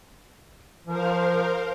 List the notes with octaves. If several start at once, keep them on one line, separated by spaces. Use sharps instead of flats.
F3 A#4 C5 F5